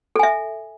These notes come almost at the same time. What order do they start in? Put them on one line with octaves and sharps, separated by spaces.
A4 G#5 E5